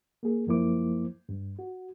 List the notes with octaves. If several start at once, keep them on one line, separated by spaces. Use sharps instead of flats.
A#3 G#4
F#2 F3 A#3 E4 C5 D6
G2
F#4